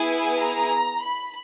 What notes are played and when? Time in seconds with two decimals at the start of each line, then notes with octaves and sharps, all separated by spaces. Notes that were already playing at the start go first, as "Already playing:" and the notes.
Already playing: B3 E4 G#4 G#5
0.40 A#5
1.03 B5